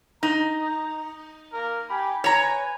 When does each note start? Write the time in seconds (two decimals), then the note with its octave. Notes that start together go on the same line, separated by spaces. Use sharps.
0.23 D#4 A#5
1.53 A#3 A#4
1.89 G4 G#5 B5
2.24 B4 C#5 G#5 A#5